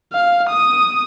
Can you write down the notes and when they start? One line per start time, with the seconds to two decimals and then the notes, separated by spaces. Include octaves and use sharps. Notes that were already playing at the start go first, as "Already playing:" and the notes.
0.13 F5
0.50 D#6